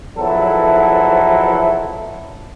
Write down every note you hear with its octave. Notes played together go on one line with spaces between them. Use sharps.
B1 E2 F3 F#3 E4 A4